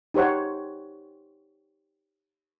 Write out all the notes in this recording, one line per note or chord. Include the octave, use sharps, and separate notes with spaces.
D#4 G4 C5 C#5 F#5